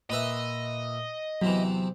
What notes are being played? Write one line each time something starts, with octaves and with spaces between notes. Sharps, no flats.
A#2 B4 D#5 E5
E2 C3 E3 F#3